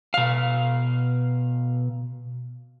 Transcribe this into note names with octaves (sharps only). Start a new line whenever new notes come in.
B2 F5